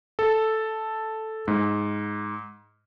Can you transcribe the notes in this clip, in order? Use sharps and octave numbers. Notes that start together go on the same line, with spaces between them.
A4
G#2